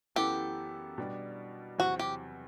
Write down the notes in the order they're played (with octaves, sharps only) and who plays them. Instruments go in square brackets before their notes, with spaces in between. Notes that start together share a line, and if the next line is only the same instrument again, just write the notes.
[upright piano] F#2 E3 B3 E4 A4 [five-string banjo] G4
[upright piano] B2 G3 D4
[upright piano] E2 C3 F#3 C4 E4 [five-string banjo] F#4
[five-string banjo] G4